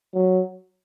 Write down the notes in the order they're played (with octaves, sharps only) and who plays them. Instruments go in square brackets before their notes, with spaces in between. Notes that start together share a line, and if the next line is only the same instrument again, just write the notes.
[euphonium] F#3